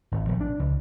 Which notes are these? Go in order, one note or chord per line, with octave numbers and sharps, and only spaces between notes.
G#1
A#1
D4
C#2